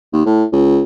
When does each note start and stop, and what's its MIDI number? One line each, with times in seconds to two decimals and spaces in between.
0.13 0.26 39
0.26 0.44 45
0.52 0.84 37